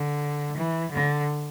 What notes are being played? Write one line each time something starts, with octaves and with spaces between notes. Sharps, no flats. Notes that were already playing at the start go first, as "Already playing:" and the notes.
Already playing: D3
E3
D3